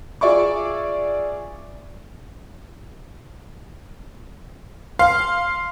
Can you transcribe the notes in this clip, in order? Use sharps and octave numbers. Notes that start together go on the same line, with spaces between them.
F4 G#4 D5 E5 C#6 D6
F5 C6